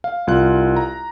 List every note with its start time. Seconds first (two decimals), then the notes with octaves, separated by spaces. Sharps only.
0.04 F5
0.27 C2 F4 F#6
0.76 A#5